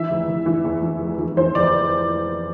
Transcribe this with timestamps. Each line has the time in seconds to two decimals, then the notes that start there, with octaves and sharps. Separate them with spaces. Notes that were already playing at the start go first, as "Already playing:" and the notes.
Already playing: E3 E5
0.10 F1
0.28 F1
0.46 E3
0.64 E2
0.83 E3
1.01 F1
1.19 E3
1.37 E3 C5
1.55 F1 D5